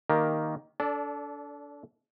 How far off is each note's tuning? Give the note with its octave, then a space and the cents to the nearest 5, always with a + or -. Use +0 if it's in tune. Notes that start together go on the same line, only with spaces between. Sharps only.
D#3 +0 A#3 +0 G4 +0
D4 -30 A4 +0 D5 +0